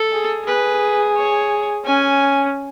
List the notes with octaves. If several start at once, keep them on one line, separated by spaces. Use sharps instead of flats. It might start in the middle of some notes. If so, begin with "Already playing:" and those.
Already playing: A4
G#4
G#4 B4
C#5
C#4 G#5